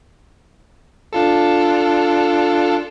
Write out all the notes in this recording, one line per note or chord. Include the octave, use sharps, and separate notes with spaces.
D4 F4 A4